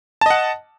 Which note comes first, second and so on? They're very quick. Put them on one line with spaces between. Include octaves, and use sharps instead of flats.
A5 D#5 F#5